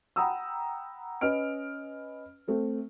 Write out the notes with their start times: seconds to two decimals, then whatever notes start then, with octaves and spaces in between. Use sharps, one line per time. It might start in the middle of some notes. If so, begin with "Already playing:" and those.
0.16 F#5 G5 A#5 B5 D#6 E6
1.21 C#4 B4 D#5 F6 D7
2.47 A3 C4 A4